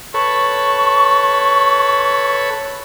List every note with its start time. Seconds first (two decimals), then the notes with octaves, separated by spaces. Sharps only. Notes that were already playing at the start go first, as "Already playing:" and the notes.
0.14 A4 B4 C#5 C#6